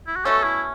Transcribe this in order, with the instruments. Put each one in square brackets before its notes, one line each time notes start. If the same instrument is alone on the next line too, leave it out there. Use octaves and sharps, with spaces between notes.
[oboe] E4
F#4
[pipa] B2 A3 C#4 [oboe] A4
[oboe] E4